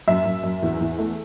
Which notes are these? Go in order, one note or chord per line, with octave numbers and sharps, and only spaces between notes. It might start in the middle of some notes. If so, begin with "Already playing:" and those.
F#2 E5
F#2
F#2
E2
E2
A3